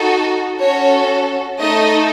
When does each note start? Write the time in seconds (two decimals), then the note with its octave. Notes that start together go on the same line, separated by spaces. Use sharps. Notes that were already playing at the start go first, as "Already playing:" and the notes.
Already playing: D#4 F#4 A4
0.60 C#4 F#4 A4 C#5
1.58 A3 D#4 A4 D#5